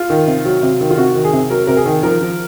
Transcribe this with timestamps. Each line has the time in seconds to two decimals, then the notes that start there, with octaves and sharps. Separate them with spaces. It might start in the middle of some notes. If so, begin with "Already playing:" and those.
Already playing: F4
0.10 D#3
0.27 C3
0.45 F#3
0.62 C3
0.81 D#3
0.91 F4
0.98 C3 F#4
1.15 D#3
1.24 G#4
1.33 C3
1.50 F#3 A#4
1.67 C3 A#4
1.77 G#4
1.86 D#3
2.03 F3 A#4
2.21 F3